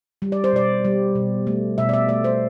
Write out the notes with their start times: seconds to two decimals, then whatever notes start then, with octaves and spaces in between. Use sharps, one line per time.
0.22 G3
0.32 D5
0.44 C5
0.53 B2 D5
0.85 G3
1.15 B2
1.47 A3
1.78 B2 E5
1.89 D5
1.93 E5
2.09 A3 D5
2.24 C5